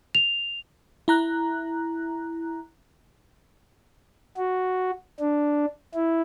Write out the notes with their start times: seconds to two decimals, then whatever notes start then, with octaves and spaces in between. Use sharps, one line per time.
0.15 F7
1.08 E4 A#5 F#6
4.37 F#4
5.20 D4
5.94 E4